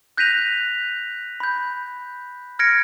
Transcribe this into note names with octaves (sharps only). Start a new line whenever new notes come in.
F#6 G6 A#6 B6 D#7 F7
B5 G6
F6 G#6 A#6 C#7 D7